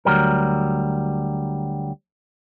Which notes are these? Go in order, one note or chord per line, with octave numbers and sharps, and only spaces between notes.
D2 F#3 G3 A#4